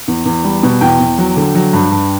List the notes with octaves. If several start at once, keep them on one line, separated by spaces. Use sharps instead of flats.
E2
E2
G3
B2
E2 G5
E2
F#3
D3
F#3
G2
G2